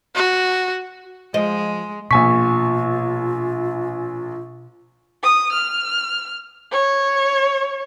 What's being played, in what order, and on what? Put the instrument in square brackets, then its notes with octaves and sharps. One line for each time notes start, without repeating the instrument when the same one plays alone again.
[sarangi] F#4
[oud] F3 D#5 [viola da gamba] G#3
[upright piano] A#1 G#5 B6 [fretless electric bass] B2 A#3 [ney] F4 [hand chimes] C#6
[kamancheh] D#6
F6
C#5